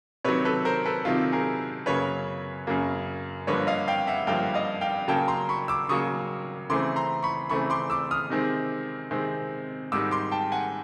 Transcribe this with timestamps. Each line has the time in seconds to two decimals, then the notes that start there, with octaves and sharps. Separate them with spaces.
0.24 C3 D#3 F#3 B4 C#5
0.45 A4 B4
0.65 A#4 C5
0.86 A4 B4
1.05 C3 D#3 F#3 F4
1.32 G#4 A#4
1.86 F#2 C#3 F#3 A#3 B4 C#5
2.67 F#2 C#3 F#3 A#3
3.47 G2 D3 F3 A#3 B4 C#5
3.67 D#5 F5
3.88 F5 G5
4.07 E5 F#5
4.27 G2 D3 F3 A#3 F5 G5
4.54 D#5 F5
4.81 F5 G5
5.08 C#3 F#3 A#3 G5 A5
5.28 A#5 C6
5.49 B5 C#6
5.68 D6 E6
5.89 C#3 F#3 A#3 C#6 D#6
6.70 C#3 E3 A3 C4 C6 D6
6.96 A#5 C6
7.23 B5 C#6
7.49 C#3 E3 A3 C4 B5 C#6
7.70 C6 D6
7.90 D6 E6
8.11 D#6 F6
8.30 C3 D#3 G#3 C4
9.11 C3 D#3 G#3 C4
9.92 G#2 D#3 G3 D6 E6
10.11 C6 D6
10.32 G5 A5
10.52 F#5 G#5